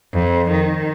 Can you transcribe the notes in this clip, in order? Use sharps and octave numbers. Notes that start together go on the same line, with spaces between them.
F2
D#3